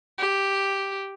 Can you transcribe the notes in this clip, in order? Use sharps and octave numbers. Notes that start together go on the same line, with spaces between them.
G4